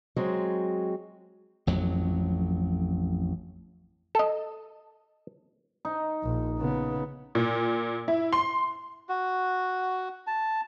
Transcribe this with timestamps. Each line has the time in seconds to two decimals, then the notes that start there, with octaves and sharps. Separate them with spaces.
0.16 F#3 G#3 C4
1.67 A1 F2 F#3
4.15 A4 D#5
5.85 D#4
6.24 A#1
6.59 C#3 B3
7.35 A#2
8.08 E4
8.33 C6
9.09 F#4
10.27 A5